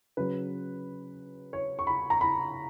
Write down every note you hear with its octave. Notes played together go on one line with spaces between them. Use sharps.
C#3 F#3 B4
C#5
C#6
B5
A#5
B5